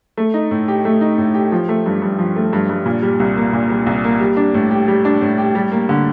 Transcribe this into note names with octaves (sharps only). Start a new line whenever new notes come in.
A3
D#4
A2
G4
A3
D#4
A2
G4
F3
A3
G2
G2
F3
A3
G2
G2
A#2
G3
C2
A#3
A#2
G3
C2
A#3
G3
D4
A2
G4
G3
D4
A2
G4
G3
A#3
D3